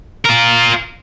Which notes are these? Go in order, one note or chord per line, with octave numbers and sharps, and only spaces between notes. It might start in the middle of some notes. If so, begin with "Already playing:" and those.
F4 A#4